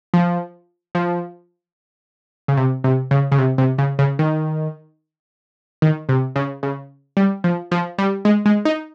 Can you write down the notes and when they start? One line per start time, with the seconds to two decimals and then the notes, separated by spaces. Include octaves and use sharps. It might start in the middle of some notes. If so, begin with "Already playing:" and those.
0.14 F3
0.95 F3
2.48 C#3
2.57 C3
2.84 C3
3.11 C#3
3.32 C#3
3.38 C3
3.58 C3
3.78 C#3
3.99 C#3
4.19 D#3
5.82 D#3
6.09 C3
6.36 C#3
6.63 C#3
7.17 G3
7.44 F3
7.72 F3
7.98 G3
8.25 G#3
8.46 G#3
8.65 D#4